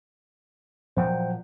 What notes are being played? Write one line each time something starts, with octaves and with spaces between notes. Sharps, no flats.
A#2 F3 F#3 C5 F#5 G5